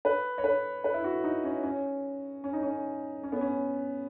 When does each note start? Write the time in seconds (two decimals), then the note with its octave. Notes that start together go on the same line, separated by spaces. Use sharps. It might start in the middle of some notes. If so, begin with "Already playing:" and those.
0.05 B4
0.38 C#5
0.44 B4
0.84 B4
0.94 E4
1.04 F#4
1.24 D#4
1.44 C#4
1.63 C#4
2.44 C#4
2.53 D#4
2.63 C#4
3.23 C#4
3.32 B3
3.41 C#4